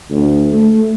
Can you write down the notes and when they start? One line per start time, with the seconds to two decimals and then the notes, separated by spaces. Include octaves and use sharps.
0.10 D2
0.53 A3